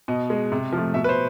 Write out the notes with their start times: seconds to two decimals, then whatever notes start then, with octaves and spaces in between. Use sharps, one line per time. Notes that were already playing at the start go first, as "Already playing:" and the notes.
0.08 B2 D#5
0.30 G#3
0.52 C3
0.72 F3
0.78 A3
0.94 B2 E5
1.04 B4
1.09 C5